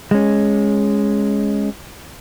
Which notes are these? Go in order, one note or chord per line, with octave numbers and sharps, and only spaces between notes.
G#3 C#4